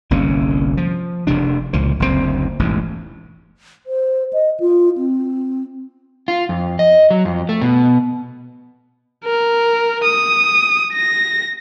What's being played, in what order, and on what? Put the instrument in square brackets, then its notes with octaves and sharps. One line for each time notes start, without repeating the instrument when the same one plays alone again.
[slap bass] G1 C2 A#3 C#4
F3
F1 C3 D4
C#2 A#2 F3
F#1 D2 A#2 C4
E1 A1 G#2
[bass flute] C5
D#5
F4
C4
[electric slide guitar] F4
F2
D#5
F#3
F2
A3
B2
[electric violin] A#4
D#6
A#6